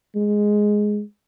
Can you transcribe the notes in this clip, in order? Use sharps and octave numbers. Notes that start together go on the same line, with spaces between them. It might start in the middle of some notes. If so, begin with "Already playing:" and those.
G#3